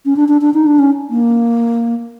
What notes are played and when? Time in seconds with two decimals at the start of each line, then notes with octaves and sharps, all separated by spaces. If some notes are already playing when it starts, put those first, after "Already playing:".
0.05 C#4
0.16 D4
0.28 D4
0.41 D4
0.54 D#4
0.66 D4
0.79 C#4
1.10 A#3